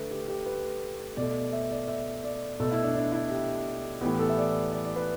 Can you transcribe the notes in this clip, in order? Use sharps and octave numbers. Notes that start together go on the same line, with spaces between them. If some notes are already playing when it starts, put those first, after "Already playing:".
Already playing: D3 A3 B4
G4
G4
B4
B2 A3 D5
E5
D5
E5
D5
B2 A3 A4
E4
D4
D4
E4
G4
A2 E3 B3 G4
A4
E5
D5
D5
D5
B4